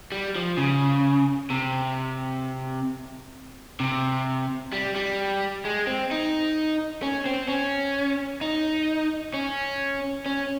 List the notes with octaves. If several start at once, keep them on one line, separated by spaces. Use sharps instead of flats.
G3
F3
C#3
C3
C3
G3
G3
G#3
C4
D#4
C#4
C4
C#4
D#4
C#4
C#4